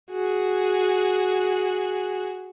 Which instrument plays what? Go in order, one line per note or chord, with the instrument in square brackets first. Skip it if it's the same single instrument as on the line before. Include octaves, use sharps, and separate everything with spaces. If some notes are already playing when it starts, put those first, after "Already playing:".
[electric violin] F#4 G#4